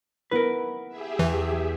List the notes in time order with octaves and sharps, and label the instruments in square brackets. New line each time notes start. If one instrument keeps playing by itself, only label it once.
[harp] B3 E4 [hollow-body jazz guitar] A#4 B4
[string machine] G4 G#4 E5
[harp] E2 [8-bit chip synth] E3